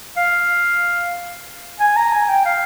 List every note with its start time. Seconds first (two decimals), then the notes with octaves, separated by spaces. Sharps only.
0.17 F5
1.80 G#5
1.97 A#5
2.12 G#5
2.29 G5
2.45 F5